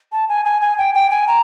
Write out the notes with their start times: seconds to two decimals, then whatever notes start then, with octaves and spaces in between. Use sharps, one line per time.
0.12 A5
0.29 G#5
0.45 G#5
0.61 G#5
0.78 G5
0.94 G5
1.10 G#5
1.27 A#5